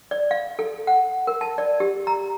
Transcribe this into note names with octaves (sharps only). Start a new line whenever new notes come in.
D5
F5
A4
F#5
A#4
A5
D5
G4
A#5